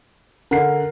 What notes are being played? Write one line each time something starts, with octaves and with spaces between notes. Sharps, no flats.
D3 A#4 C7